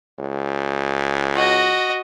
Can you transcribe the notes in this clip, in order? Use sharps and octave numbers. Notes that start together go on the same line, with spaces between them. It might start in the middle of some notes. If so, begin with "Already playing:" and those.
C#2
F#4 D#5